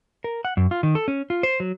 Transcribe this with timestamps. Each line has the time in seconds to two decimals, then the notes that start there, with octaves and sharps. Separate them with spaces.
0.24 A#4
0.45 F#5
0.57 F#2
0.71 F4
0.83 D#3
0.95 A4
1.08 C#4
1.30 F4
1.43 C5
1.60 F#3